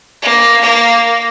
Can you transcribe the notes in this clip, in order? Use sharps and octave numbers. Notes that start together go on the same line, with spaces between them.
A#3
A#3